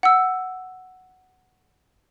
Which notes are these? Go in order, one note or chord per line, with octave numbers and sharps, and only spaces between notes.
F#5 E6